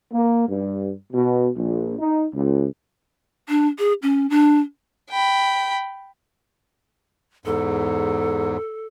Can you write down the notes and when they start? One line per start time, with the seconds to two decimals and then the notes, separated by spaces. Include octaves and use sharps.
0.12 A#3
0.47 G2
1.12 B2
1.55 A#1
1.99 D#4
2.33 C#2
3.49 D4
3.79 G#4
4.02 C#4
4.30 D4
5.10 G5 B5
7.46 E2 G#2 A4